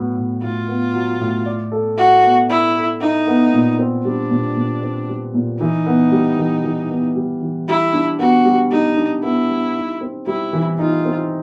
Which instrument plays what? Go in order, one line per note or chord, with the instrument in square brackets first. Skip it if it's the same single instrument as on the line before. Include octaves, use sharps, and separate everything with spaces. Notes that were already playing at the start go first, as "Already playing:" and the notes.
Already playing: [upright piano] A2 F#3 B3
A2
[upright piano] A2 [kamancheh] F4
[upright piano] B3
F#3
A2
D5
A4
[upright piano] E4 [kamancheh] F#4
[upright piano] B3
[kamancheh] E4 [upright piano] D5
[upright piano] A4
[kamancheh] D#4 [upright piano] E4
[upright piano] B3
A#2
C4
[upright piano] G3 [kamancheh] D4
[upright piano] A#2
A#2
C4
G3
A#2
[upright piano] E3 [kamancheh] D#4
[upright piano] B3
G3
E3
E3
B3
G3
E3
[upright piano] G3 [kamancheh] E4
[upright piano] D4
[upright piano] B3 [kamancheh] F#4
[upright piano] G3
[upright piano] G3 [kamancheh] D#4
[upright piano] D4
[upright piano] B3 [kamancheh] E4
[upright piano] G3
D#4
C4
[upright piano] G3 [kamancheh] E4
[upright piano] E3
[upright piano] D#4 [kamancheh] F4
[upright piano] C4